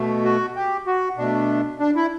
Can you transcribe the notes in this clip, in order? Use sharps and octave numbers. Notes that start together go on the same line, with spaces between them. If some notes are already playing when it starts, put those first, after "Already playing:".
Already playing: B2 A3
F#4
G4
F#4
B2 A3 D4
D4
E4